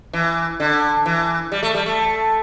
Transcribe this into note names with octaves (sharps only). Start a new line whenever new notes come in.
E3
D3
E3
G3
A3
G3
A3